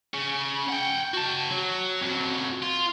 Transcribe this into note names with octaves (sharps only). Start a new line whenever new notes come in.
C#3
F#5 G5
F#4 A5
F#3
F2 F#3
F4